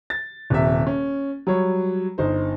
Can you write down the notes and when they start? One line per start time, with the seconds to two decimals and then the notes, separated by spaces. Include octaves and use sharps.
0.10 A6
0.50 D#1 C3 E5
0.87 C#4
1.47 F#3 G3 C#5
2.18 G1 D#4 C5